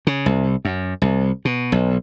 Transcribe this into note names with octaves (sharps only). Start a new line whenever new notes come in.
C#3
C2
F#2
C2
B2
B1